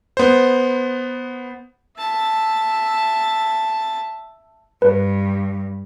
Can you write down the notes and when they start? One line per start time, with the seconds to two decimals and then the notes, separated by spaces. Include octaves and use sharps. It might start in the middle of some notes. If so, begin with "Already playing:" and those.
0.17 B3 C5
1.97 E5 A5
4.82 G2 B4